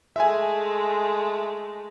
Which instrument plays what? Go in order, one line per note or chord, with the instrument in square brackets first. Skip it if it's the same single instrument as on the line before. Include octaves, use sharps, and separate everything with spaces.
[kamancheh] G#3 A3 [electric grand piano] E5 G#5